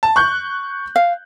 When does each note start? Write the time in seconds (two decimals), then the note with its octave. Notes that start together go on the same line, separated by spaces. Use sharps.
0.03 A5
0.16 C#6 F#6 G6
0.96 F5